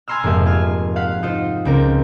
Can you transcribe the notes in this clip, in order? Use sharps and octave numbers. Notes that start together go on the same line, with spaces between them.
G#5 A#5 C6 E6 F6
F1 G#2 A#3 E5 F5
F4 G#5 F6
F5 F#5 B6
D#4 F4 C5
C#2 C4 A#4